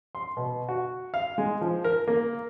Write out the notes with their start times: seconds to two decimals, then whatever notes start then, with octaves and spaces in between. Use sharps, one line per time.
0.15 C6
0.37 B2
0.69 F#4
1.14 F5
1.38 G#3
1.61 F3
1.84 A#4
2.08 A#3